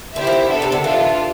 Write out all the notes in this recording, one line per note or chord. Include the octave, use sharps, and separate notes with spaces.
D3 E4 G4 C5 E5
F3
E3
B3 D4 A4
C3
D3
E3 D4 F4 A4